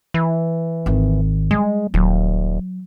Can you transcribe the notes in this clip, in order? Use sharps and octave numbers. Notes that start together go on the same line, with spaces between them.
E3
G#1 D#3
G3 G#3
D#1 F#3